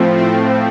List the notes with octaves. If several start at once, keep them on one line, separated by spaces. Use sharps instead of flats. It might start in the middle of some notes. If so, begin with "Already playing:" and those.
Already playing: A2 F3 A3 C4
C4